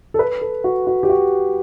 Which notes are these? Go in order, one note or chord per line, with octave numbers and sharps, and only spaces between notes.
A4
B4
A4
F#4
F#4
G4
F#4